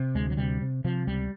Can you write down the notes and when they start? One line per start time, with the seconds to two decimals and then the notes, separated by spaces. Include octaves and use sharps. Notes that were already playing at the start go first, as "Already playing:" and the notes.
Already playing: C3
0.15 D2 G#3
0.30 F#3
0.37 C3 G3
0.61 C3
0.84 C3 F3
1.07 C#2 G3